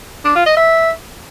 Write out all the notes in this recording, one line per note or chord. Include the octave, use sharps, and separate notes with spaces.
D4
F4
D#5
E5